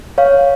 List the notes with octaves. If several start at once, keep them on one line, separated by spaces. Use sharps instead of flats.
C#5 F5